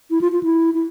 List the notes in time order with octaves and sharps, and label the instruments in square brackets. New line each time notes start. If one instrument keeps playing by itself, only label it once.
[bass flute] E4
F4
F4
E4
E4